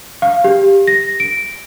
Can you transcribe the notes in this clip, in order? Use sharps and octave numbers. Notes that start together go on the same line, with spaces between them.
F5
G4
A#6
D7